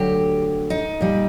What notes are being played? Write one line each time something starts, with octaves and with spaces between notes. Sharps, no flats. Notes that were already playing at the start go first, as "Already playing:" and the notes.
Already playing: D2 D3 F#3 G4
D#4
A#2 G3